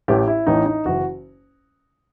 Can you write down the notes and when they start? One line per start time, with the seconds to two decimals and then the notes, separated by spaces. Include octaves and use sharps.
0.08 A1 A2 E3 G4
0.27 E4
0.47 A1 A2 E3 D#4
0.66 D#4
0.85 F#1 E3 F#4